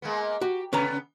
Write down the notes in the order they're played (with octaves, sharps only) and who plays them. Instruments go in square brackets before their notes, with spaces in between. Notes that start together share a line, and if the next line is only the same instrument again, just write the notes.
[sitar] G#3 A#3 B3
[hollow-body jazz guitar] F#4 [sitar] G4
[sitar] C#3 B3 [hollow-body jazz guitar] C#4 B4 A#5